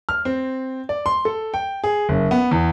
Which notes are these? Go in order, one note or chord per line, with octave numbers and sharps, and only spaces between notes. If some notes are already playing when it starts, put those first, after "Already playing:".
F6
C4
D5
C6
A4
G5
G#4
F#1
B3
E2